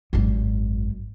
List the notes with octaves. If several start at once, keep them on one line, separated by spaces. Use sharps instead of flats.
G#1 F#2